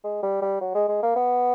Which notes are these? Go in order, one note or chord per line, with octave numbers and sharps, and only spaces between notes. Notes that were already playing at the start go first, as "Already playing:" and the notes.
G#3
G3
G3
F#3
G#3
G#3
A#3
B3